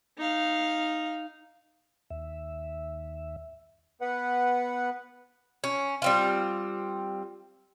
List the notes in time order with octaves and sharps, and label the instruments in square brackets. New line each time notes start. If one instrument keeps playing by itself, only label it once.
[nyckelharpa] D#4 F5
[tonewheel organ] D#2 E5
[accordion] B3 B4 F#5
[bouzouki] C#4
G3 C4 F4